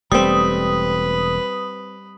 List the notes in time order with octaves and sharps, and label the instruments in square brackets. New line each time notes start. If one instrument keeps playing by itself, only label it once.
[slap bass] E1 A3 [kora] G3 C4 [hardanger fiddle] B4 [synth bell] D#6